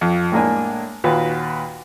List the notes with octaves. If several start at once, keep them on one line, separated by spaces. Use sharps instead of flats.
F2
A2 G#3 A#3 D4 G#5
D#2 A#2 F4 F#4 B4